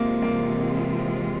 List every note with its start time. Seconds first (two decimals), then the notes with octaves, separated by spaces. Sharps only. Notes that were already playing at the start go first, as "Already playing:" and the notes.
Already playing: C3 E3 G#3 A#3 C4 F4
0.22 A#3